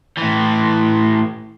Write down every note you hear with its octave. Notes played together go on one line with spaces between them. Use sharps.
A2 E3